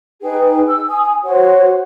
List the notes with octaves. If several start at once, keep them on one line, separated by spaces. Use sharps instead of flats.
D#4 G#4 B4 G5
E6
G#5 D#6
F#4 C5 C#5 F#5